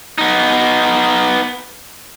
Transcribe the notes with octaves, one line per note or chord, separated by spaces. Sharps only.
B3 D#4